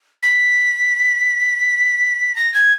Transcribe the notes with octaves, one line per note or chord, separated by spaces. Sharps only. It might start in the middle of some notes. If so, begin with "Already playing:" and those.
B6
A#6
G#6